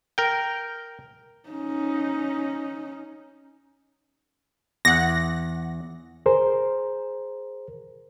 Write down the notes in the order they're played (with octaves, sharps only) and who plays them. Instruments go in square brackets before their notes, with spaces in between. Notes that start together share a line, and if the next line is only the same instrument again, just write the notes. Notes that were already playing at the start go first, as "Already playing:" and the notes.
[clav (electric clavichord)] A#4 G5
[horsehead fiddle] C#4 D#4
[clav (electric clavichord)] E2 [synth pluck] F#5 A#6
[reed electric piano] G#4 A#4 C5